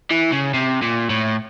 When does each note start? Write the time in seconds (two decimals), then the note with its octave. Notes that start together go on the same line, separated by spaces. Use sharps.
0.11 E3
0.32 C#3
0.54 C3
0.82 A#2
1.10 A2